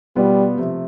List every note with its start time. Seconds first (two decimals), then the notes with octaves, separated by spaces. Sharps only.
0.16 B2 G3 B3 F4
0.57 C3 F3 A3